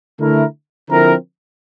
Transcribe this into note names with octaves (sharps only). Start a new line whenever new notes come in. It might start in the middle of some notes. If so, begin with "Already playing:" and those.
D3 A3 E4 A#4
D3 F3 C4 E4 A#4